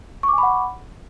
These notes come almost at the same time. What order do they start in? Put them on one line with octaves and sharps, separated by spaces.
C#6 D6 G#5 B5 F#5